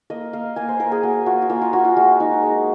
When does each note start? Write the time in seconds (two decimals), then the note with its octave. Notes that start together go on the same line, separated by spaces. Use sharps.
0.10 A#3 D#5
0.33 A#3 F5
0.56 A#3 G#5
0.68 C5
0.80 A#3 A#4
0.92 G#4
1.03 A#3 F#4
1.26 F4 F#4
1.42 F#4
1.50 A#3 F4
1.61 F4
1.73 F4 F#4
1.85 F4
1.97 G#3 F#4
2.20 D#4
2.43 G#3